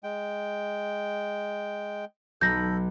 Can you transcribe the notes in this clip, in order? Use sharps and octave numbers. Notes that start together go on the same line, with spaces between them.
G#3 G5
B1 A4 B5 G6 A#6